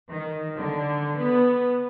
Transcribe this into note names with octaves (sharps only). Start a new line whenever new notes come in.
D#3
D3
B3